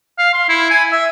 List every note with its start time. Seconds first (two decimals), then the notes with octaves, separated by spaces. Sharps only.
0.18 F5
0.34 C6
0.49 E4
0.71 G#5
0.92 E5